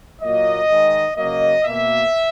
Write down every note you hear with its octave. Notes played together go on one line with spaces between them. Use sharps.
A#2 F#3 A#3 D#5
D#3 G#3
C#3 F#3 A#3 D#5
B2 A#3 E5